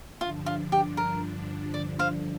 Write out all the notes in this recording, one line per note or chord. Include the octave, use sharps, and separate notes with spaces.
G2 D3 F3 D4 F4
F4
G4
A#4
D5
C5 F5